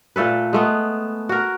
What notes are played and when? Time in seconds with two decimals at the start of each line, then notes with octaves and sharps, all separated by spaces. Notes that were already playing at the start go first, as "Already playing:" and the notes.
0.16 A#2 A3 A4 B4
0.53 G#3 A3 B3
1.29 F#4 A#4